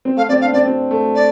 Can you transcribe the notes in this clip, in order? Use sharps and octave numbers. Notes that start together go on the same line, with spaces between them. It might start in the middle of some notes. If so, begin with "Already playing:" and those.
C4
A3 F5
C4 D5
D4 F5
C4 D5
C4
A3
D5